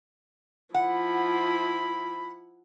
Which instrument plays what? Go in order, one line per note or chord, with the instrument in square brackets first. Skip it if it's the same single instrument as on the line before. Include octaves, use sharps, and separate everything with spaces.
[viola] F3 E4 [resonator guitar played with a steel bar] F#5 [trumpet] B5